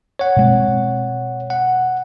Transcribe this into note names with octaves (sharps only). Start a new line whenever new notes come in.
C#5 F#5
B2 G#3 C4
F#5